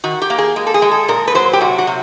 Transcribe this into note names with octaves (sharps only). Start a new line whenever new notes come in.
D#3 F#4
G4
A#3
G#4
G#3
A4
G#4
G#3
A4
A#2 A#4
B4
F#3 C5
G4
C3 F#4
F#4
C3